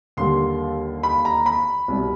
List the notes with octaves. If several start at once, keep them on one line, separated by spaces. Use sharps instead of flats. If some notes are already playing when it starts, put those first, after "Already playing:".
D#2 D3 G3 A#3 C6
B5
A#5
B5
C2 B2 G3